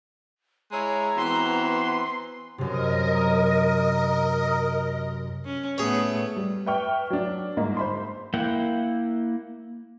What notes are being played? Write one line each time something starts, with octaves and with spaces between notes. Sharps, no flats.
G#3 E4 C#5 A#5
E3 B3 C4 F#4 C6
F#2 C3 A#4 D#5
C#4
A2 A3 B3 G#4 C#5
G3
B4 E5 G5 C#6 F6
F#3 D4
G1 G#2 A#3 D#5
C5 B5 C6
A#3 E4 F#5 G5